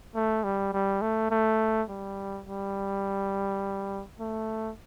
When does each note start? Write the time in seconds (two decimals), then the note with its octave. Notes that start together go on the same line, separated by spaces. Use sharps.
0.15 A3
0.44 G3
0.73 G3
1.02 A3
1.31 A3
1.89 G3
2.47 G3
4.20 A3